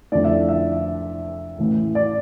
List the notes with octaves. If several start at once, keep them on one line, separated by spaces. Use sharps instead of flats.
F2 D3 A3 D5
E5
E5
A1 A2 E3
D5